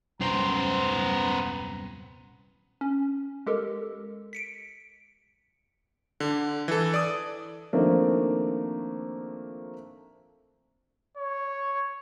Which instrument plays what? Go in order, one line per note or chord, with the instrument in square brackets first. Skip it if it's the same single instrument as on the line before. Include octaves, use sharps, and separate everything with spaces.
[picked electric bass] D#1 C2 F#2 [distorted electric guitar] B3 C5 [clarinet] A#5
[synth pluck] C#4
G#3 G4 A4 A#4
B6 C#7 D7
[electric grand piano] D3
E3 A4
D5 D#6
[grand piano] D#3 F3 A3 A#3 C4 D4
[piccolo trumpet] C#5